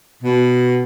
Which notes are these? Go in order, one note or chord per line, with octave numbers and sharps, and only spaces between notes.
B2